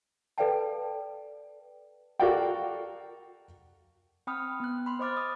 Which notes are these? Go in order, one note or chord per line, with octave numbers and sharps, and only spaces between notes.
A4 B4 D5 F5 G5 A5
F#4 A4 A#4 D5 F5 G5
C4 G5 B5 D#6 F6
B3 F#6
B5 C6
C5 D#5 B5 D6 F6 A6
D#6